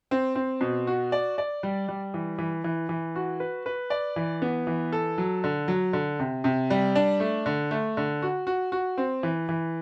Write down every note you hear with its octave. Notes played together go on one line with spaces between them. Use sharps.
C4
C4
B2
F#4
D5
D5
G3
G3
E3
E3
E3
E3
F#4
B4
B4
D5
E3
B3
E3
A4
F#3
D3
F#3
D3
C3
C3
G3
D4
A3
D3
A3
D3
F#4
F#4
F#4
C4
E3
E3